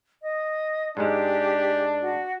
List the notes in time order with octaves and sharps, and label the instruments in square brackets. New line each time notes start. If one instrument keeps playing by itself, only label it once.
[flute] D#5
[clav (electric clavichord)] G#2 G#3 [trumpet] D4 [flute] G4
[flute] F#4